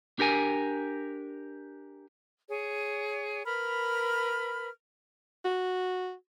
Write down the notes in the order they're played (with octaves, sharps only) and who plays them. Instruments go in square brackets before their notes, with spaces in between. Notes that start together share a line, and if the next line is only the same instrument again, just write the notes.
[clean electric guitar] D4 G4 A#4 G#5
[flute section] G#4 C#5
A#4 B4 B5 F6
[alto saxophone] F#4